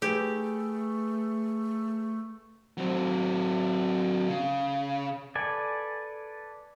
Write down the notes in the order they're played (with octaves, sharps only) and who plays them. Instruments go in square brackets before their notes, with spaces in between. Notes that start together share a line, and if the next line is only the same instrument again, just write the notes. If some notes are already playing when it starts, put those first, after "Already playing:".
[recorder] A3 [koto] G4 [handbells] G#4 B4
[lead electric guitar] F#3 C4
C#3
[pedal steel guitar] A4 B4 D5 G#5